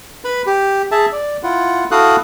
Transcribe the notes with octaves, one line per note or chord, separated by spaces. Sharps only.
B4 B5
G4
G#4 E5 A5
D5
E4 F4 F#5
E4 F#4 A4 F5 D#6 F#6